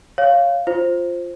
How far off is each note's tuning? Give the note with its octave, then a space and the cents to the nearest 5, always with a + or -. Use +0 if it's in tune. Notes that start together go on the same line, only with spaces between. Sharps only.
C#5 +0 F5 -5
F4 +0 C5 +5